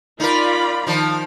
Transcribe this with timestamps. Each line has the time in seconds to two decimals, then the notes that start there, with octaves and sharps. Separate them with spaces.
0.20 D#4 F4 A#4 D5 B5
0.87 D#3 F3